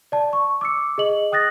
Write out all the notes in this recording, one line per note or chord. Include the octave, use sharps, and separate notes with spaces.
D5 A5
C#6
D6 E6 C#7
G#4 D#5 F#7
G5 D#6 F#6 A6 A#6